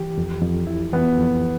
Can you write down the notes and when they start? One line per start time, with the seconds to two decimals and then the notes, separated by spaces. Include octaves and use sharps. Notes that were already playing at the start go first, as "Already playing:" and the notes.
Already playing: E3 G4
0.18 F2
0.42 F2
0.67 E4
0.93 E3 B3
1.19 F2